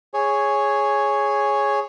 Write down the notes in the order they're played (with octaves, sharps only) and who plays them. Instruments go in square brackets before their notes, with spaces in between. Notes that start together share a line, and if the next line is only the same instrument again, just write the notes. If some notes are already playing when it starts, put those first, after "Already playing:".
[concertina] G#4 C#5